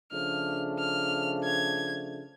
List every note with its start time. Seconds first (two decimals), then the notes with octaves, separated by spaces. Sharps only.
0.12 C#3 F3 A3 D4 F6
0.79 F6
1.44 G#6